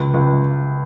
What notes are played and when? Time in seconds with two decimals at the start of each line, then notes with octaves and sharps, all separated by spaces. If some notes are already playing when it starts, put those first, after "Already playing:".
Already playing: C#2
0.14 C#2